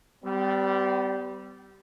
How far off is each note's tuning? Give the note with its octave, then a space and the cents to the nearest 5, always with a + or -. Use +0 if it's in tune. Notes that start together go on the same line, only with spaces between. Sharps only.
G3 -15 B3 +40